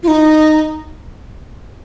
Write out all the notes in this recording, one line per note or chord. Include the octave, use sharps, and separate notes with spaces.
F4
D#4